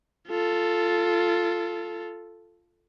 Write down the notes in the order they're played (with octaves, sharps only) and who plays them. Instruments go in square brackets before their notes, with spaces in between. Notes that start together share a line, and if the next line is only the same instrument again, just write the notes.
[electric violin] F4 A4